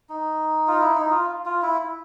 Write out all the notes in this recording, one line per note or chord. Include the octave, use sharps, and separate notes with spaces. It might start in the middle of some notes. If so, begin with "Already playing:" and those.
D#4
F4
E4
D#4
F4
F4
E4